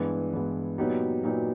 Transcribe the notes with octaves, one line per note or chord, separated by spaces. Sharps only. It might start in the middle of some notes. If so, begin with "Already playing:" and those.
Already playing: G2 E3 G#3 B3
G2 E3 G#3 B3
A#2 F#3 B3 D#4 G4
A#2 F#3 B3 D#4 G4